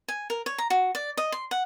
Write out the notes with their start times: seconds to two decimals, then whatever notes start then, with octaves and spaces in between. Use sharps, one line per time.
0.08 G#5
0.30 A#4
0.46 C#5
0.58 A#5
0.70 F#4
0.95 D5
1.17 D#5
1.32 C6
1.51 F#5